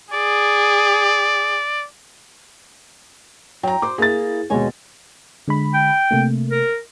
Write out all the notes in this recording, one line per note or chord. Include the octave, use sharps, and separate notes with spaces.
G#4 D5
F#3 G5 A#5
F#4 C5 D6
A#3 E4 G#4 A6
D#2 B2 G#3 C#5 G#5
D3 G#3 B5
G5
C3 A3 A#3
A#4